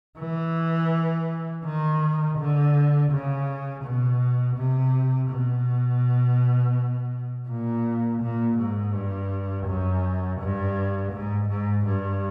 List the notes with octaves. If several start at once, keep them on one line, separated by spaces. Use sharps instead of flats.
E3
D#3
D3
C#3
B2
C3
B2
A#2
A#2
G#2
G2
F#2
G2
G#2
G#2
G2